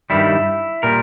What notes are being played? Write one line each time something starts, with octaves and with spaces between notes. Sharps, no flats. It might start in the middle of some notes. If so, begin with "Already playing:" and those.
G2 D#3 G3 E4
A#2 G3 A#4